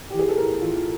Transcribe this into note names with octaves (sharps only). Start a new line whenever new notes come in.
E3 G4
G#4
A4
A2 A#4
E3 F4